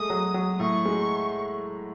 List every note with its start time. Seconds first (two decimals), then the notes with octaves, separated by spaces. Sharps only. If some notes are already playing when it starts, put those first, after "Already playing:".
Already playing: G#3 A3 D#6
0.10 F#3
0.34 F#3
0.60 A2 C#6
0.86 G#3